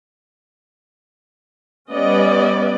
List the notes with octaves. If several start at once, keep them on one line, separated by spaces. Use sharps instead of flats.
G3 B3 C#4 B4 D5 D#5